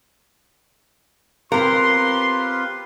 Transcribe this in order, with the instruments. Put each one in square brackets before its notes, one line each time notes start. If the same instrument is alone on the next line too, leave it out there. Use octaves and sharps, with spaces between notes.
[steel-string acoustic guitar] C4 F5 [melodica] F4 G4 B4 [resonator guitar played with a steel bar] A#4 [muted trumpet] C6